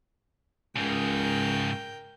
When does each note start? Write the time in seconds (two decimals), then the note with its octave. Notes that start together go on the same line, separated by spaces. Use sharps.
0.76 C#2 G#2 C#3 A#4 G5